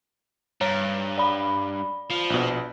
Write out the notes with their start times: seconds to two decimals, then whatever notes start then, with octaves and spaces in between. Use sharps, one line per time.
0.61 G2 C#5 A#5
1.18 D5 B5
2.10 F3
2.30 A#1 B2